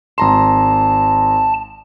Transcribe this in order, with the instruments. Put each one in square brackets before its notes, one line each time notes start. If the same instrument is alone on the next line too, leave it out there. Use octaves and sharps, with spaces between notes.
[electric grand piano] G#1 A#5 C6 [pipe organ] A5